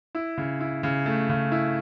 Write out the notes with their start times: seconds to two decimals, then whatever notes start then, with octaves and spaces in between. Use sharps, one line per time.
0.15 E4
0.37 C#3
0.61 E4
0.83 C#3
1.06 A3
1.29 C#3
1.52 E4